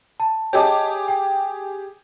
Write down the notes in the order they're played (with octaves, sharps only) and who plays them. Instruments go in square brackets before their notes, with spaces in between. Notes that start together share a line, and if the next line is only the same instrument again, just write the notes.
[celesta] A5
[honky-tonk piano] G4 G#4 D6 [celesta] C#5 D#5 A5
[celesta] G5